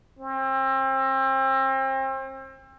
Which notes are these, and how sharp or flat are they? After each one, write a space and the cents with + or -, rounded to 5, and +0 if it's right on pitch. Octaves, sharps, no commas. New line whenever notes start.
C4 +35